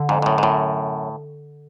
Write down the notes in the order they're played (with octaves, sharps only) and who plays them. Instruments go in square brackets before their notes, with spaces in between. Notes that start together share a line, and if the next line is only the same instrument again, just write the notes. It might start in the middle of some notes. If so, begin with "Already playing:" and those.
Already playing: [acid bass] D3
[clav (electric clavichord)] F2 G#2
G#2
F#2 A2
G#2
F#2 A2